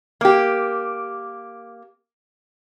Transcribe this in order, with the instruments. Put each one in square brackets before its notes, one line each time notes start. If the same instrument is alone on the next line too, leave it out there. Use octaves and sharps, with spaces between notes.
[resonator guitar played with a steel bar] A#3 G4